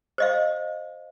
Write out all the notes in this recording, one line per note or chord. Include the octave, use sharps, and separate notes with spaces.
C5 D#5 F5